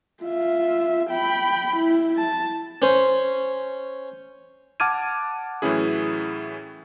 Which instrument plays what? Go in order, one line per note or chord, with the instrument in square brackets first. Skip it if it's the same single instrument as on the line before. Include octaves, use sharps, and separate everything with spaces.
[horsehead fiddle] F4 E5
G5 B5
E4
A5
[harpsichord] C#4 C5
[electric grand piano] F#5 A5 D6 F6 G#6 D#7
A2 E3 F#3 C#4 E4 G#4